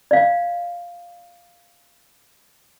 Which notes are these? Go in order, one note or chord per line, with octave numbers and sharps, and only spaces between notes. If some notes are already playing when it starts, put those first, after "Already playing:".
D5 F5